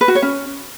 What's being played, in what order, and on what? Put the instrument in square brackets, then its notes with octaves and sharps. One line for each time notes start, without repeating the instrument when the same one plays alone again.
[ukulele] B4
F#4
C#5
C#4